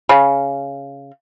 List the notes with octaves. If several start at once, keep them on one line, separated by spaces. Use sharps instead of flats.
C#3